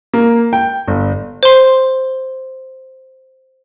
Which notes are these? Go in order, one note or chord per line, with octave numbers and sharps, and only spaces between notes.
A#3
G5
G1
C5 C6